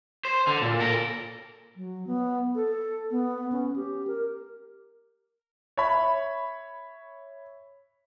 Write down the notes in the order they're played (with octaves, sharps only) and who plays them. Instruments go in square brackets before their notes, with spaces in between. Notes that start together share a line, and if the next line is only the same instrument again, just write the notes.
[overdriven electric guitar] C5
D3
A#2
A4 A#4
[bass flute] F#3
B3
A4
B3
C#4
G4
A#4
[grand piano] C#5 E5 B5